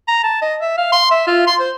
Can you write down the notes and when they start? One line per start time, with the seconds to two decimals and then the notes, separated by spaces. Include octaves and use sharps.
0.08 A#5
0.23 A5
0.42 D#5
0.62 E5
0.78 F5
0.92 C6
1.11 E5
1.27 F4
1.47 C6
1.60 C5